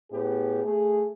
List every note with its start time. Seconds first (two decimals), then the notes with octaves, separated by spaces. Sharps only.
0.11 A2 B3 G4 G#4
0.64 A3 G#4